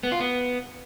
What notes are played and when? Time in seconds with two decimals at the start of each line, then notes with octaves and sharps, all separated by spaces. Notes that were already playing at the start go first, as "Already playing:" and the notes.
0.03 B3
0.12 F4
0.20 B3